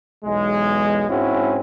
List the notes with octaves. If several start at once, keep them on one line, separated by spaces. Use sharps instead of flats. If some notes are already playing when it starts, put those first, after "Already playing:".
B1 E2 G#3
G#2 C4 C#4 E4 F#4